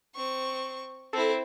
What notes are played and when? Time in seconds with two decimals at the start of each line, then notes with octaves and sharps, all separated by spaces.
0.15 C4 C#6
1.13 C4 E4 A4